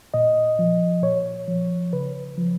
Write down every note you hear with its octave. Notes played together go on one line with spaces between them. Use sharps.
A#2 D#5
F3
A#2 C#5
F3
C#3 B4
F3